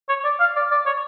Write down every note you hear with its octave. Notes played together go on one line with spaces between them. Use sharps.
C#5
D5
F5
D5
D5
C#5